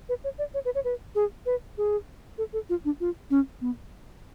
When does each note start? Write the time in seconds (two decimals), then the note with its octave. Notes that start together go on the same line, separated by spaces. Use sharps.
0.09 B4
0.24 C#5
0.38 D5
0.54 C#5
0.65 B4
0.75 C#5
0.84 B4
1.15 G#4
1.46 B4
1.78 G#4
2.38 A4
2.53 A4
2.69 F4
2.85 D4
3.00 F4
3.30 C#4
3.61 B3